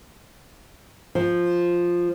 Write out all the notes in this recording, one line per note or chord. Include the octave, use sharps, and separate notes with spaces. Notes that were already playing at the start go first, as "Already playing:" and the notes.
F3